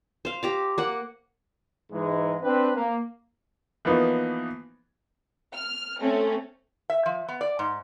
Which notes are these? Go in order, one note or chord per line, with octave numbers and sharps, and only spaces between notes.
C5 F5
G4 A#5 D6
A#3 F#5
G#2 E3 G#3
C4 D4 B4
A#3
E3 F3 A#3 B3 D#4
F6
A3 C4 C#4
E5
F3
B3
D5
G#2